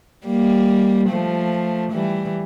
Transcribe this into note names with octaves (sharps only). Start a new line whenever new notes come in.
G3 A#3
F3 A3
E3 G3